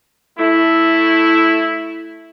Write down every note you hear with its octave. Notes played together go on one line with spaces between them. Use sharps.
A3 E4